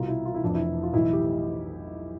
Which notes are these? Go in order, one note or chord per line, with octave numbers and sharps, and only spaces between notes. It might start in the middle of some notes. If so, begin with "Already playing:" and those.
Already playing: C2 B2 F4
E4
F4
E4
F1 F2 E3 D4
E4
F4
B1 A2 E3 E4
G4